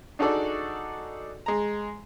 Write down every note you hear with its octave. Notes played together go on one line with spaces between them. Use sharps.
D4 D#4 F#4 G#4 A4 D5
G#3 A#5